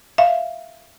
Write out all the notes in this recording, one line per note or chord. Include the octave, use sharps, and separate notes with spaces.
E5 F5